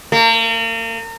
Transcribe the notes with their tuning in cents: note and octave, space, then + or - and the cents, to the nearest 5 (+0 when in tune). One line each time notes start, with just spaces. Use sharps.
A#3 -40